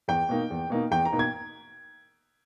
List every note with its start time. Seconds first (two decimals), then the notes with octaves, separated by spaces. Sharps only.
0.08 E2 G5
0.29 B2 A#3 D#4
0.50 E2
0.70 B2 A#3 D#4
0.91 E2 G5
1.05 A#5
1.12 B2 A#3 D#4
1.19 G#6